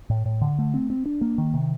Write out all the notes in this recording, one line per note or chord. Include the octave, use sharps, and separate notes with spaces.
A2
A2
D3
A3
C4
C4
D4
A#3
D#3
C3